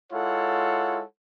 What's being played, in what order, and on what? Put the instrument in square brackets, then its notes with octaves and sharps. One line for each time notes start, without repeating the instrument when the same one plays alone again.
[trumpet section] G#3 E4 F4 A4 C#5 F#5